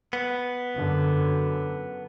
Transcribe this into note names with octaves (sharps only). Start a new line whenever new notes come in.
B3
F#2 D3